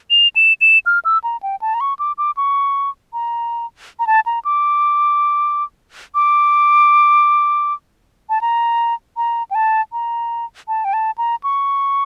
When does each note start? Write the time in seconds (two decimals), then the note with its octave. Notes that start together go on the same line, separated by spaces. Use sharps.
0.10 F7
0.36 E7
0.61 E7
0.86 F6
1.05 E6
1.24 A#5
1.43 G5
1.62 A5
1.74 A#5
1.81 C#6
1.99 D6
2.18 D6
2.37 C#6
3.13 A#5
3.99 A#5
4.07 A5
4.26 A#5
4.45 D6
6.15 D6
8.30 A5
8.41 A#5
9.17 A#5
9.51 G5
9.55 A5
9.92 A#5
10.68 A5
10.85 G5
10.93 A5
11.18 A#5
11.44 C#6